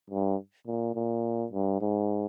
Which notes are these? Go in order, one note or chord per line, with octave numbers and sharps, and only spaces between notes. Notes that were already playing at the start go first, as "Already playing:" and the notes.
G2
A#2
A#2
G2
G#2